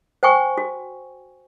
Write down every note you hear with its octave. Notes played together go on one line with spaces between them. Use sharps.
C5 G5 G#5 C#6
F#4